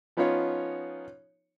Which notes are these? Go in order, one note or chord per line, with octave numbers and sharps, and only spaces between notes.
F3 B3 C#4 D#4 F4 C#5